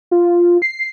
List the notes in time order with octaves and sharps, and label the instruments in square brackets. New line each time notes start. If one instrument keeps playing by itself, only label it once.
[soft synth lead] F4
C7